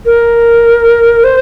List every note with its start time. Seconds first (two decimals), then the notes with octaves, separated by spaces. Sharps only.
0.06 A#4
1.24 C5